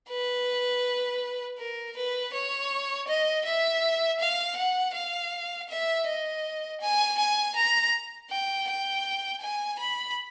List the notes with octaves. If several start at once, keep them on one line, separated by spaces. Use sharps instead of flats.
B4
A#4
B4
C#5
D#5
E5
F5
F#5
F5
E5
D#5
G#5
G#5
A#5
G5
G5
G#5
B5